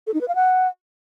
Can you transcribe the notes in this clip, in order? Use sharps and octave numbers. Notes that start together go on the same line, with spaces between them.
A4
D#4
B4
F5
F#5